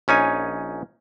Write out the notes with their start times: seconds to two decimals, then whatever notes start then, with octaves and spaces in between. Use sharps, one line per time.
0.08 A#1 C#4 D#4 G#5